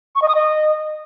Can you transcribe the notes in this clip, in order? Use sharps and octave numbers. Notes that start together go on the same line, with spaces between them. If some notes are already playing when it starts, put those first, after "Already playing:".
C#6
D#5
D#6
D#5